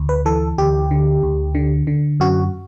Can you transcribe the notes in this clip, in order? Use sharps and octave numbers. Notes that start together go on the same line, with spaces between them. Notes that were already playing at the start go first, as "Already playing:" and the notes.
Already playing: D2
B4
E3 A4
D2 G4
D3
D2
D3
D3
F#2 F#4